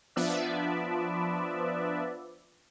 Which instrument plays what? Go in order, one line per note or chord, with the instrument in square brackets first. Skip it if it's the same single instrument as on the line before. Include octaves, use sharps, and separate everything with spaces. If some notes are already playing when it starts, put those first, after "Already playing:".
[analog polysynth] F3 B3 D4 B4 D5 E5